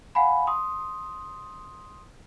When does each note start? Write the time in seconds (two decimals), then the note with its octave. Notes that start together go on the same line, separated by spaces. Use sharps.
0.15 F5 F#5 G#5 B5
0.47 C6 D#6